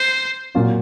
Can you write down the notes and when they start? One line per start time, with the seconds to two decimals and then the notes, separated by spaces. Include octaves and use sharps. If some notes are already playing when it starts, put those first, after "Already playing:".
Already playing: C5
0.55 A#2 F#3 A#3 C#4 F4